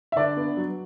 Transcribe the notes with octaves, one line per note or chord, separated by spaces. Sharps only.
E5
D3 D4 D5
B3
F#3